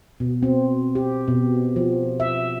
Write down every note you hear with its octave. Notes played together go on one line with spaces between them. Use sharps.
B2
C4
G4
B2
F3
E5